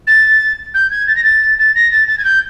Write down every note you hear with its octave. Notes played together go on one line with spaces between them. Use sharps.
A6
G6
G#6
A6
A#6
A6
A6
A#6
A6
A6
G#6
G6